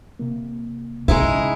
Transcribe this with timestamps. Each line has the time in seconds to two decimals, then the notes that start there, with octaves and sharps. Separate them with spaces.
0.19 C3 A#3
1.08 C#3 G#3 D#4 E4